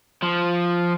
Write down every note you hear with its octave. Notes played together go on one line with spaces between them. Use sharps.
F3